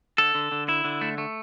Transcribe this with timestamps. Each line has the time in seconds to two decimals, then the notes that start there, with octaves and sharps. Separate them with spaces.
0.18 D3 A4
0.35 D3
0.52 D3
0.69 E4
0.84 D3
1.01 A3
1.18 A3